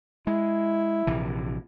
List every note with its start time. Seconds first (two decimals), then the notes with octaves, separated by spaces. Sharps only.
0.27 G#3 E4
1.07 A#1 C3 E3